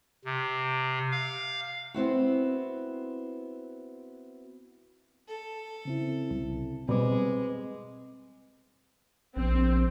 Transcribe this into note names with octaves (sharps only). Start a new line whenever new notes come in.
C3
F5
B3 C4 E4 F#4
A4
C#3 C4 E4
C2
B2 G3 G#3 C4 B4 D6
A#1 C4